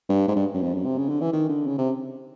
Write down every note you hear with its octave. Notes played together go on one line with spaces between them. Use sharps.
G2
G#2
G2
F#2
F2
F#2
C3
C#3
D3
E3
D#3
D3
C#3
C3